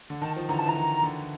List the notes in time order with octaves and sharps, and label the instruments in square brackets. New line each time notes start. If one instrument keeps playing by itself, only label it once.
[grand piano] D3
[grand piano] D#3 [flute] A5
[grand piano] F3
[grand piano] D3 E3 [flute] A#5
[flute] A5
[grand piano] E3 [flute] A#5
[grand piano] D#3
D3